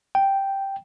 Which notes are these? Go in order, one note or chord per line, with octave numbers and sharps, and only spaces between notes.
G5